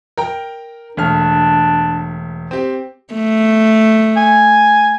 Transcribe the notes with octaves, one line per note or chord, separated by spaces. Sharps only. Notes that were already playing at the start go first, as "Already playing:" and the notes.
A#4 G5 A#5
E1 A3 D4 F6
C4 G4
A3
G#5